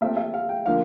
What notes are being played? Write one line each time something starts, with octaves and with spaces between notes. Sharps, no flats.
A#2 A3 C4 E5
E5
F5
G5
D3 F3 A#3 F5